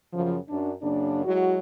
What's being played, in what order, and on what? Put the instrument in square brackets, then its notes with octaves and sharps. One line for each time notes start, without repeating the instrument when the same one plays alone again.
[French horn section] F#2 C#3 F3
F#2 D4
F#2 C#3 A#3 D4
F#3 G#3 E4 F#4